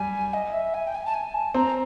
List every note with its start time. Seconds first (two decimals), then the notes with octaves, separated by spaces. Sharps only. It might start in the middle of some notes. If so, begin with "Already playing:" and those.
Already playing: G3 G#5
0.34 D#5
0.53 E5
0.74 G#5
0.87 G5
0.95 G#5
1.06 A5
1.14 G#5
1.34 A5
1.54 C4 A#5